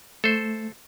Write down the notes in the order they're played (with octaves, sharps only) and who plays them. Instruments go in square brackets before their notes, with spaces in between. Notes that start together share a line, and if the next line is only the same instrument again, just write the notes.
[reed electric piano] A3 [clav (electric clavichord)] A4 C5